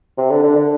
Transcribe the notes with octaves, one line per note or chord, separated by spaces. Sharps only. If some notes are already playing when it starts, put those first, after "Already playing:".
C3
D3
D3
D3